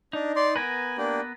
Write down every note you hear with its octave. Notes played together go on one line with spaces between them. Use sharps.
D4 D#4
D5 C6
B3 A#4 B4 G#5
A#3 D4 G4